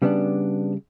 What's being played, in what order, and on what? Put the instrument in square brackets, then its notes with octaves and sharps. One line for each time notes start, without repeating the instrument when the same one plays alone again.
[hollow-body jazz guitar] C#3 G3 B3 D4